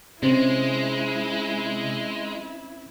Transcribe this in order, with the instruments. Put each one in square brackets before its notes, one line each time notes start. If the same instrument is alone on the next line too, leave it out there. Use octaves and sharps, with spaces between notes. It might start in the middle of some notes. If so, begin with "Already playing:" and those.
[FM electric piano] C3 [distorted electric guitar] G#3 [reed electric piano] C4 C#4 C5 [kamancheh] E4